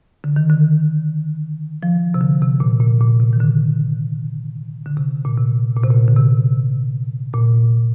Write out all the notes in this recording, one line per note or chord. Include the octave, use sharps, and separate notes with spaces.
D3
D#3
D3
F3
C3
D3
C3
A#2
A#2
A#2
C3
D#3
D3
D3
C3
A#2
C3
A#2
C3
A#2
D3
C3
A#2